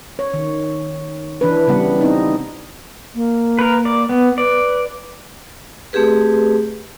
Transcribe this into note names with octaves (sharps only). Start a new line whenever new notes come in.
C#5
D#3
E3 D4 B4
C#3 G3 B3 F#5
C4 D#4
A#3
A#4 B4
D5
B3
B4 D5
A3 C4 G4 G#4 B4